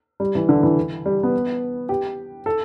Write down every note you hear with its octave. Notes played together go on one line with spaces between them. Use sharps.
G3
E3
D3
E3
G3
B3
G4
A4